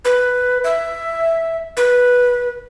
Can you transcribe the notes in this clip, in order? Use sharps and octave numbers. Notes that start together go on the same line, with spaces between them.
B4
E5
B4